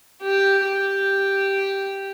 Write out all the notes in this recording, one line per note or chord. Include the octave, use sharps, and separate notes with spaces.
G4
G4